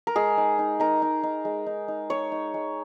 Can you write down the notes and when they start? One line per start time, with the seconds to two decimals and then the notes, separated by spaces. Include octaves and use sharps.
0.07 A#4
0.16 G#3 G#4
0.37 D#4
0.59 D#4
0.80 D#4 A#4
1.02 D#4
1.23 D#4
1.45 G#3
1.66 D#4
1.88 D#4
2.10 D#4 C#5
2.32 D#4
2.54 G#3